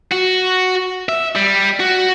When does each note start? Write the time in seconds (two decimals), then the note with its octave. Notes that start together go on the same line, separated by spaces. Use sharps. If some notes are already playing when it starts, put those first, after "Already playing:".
0.12 F#4
1.09 E5
1.35 G3
1.80 F#4